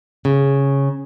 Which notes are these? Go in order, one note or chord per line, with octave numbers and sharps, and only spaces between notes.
C#3